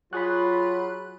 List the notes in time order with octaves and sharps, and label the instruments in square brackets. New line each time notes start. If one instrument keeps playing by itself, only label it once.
[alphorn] F#3 [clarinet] F4 [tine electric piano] F#4 G#4 C#5 [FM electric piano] B5 F#6